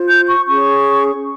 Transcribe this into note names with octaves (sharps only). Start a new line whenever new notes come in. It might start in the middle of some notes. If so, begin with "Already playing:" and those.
Already playing: F4 C5
G6
C#6
C#4 G#4 C#5 C#6